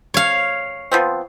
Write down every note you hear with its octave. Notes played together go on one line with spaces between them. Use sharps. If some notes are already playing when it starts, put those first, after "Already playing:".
C#5 F5
F3 B3 C4